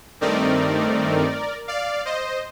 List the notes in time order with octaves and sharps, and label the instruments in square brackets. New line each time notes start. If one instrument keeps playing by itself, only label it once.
[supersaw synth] G2 D#3 A3 C4 D#4 A#4 D5
D5 F5
C5 D#5